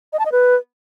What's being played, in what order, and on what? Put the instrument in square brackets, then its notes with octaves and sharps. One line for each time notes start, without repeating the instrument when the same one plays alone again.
[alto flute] D#5
A5
D#5
B4